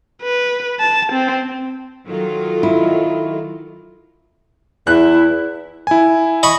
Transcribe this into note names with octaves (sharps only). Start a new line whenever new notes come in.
B4
A5
C4
D#3 F#3 F4 A4
E4
E2 E4 F#6
E4 G#5
D#5 B5 C#6